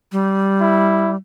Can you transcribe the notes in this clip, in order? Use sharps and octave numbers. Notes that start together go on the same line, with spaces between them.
G3
E4